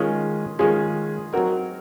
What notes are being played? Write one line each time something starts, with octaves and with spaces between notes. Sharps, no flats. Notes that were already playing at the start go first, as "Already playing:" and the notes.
Already playing: D#3 G#3 C#4 F4 G#4
D#3 G#3 C#4 F4 G#4
F#3 C4 D#4 F#4 A#4